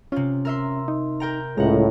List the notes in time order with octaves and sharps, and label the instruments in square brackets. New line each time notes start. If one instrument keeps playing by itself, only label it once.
[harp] C3 F4 [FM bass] C#4
[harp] A#4 E5 C6
[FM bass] D#4
[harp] A#4 G5 A#5
[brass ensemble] C#2 A2 [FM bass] G#3 [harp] F#5 A#5